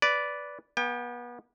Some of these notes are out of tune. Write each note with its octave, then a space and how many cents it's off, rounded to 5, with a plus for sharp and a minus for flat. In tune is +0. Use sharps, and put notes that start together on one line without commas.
B4 +0 D5 -10
B3 -30 G5 +30